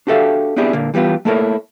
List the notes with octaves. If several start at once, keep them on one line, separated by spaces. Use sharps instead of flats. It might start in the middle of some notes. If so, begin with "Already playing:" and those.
D4 F#4 G4 A4 E5 F5
B3 C4 D4 E4 G4 G#4
A#2 D3 A#3
E3 G3 B3 F4 G4
A3 A#3 E4 A4 A#4 C#5